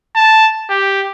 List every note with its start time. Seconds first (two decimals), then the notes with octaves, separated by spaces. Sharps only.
0.16 A5
0.70 G4